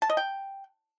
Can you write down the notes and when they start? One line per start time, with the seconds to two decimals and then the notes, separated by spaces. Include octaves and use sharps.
0.02 A5
0.10 D#5
0.17 G5